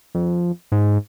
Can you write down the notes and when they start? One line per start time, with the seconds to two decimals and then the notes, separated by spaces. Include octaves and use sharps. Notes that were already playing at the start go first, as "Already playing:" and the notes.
0.15 F2
0.72 G#2